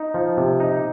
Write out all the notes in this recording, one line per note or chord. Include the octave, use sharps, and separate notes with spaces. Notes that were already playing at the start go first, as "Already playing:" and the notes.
Already playing: D#4
F3
C3
D#4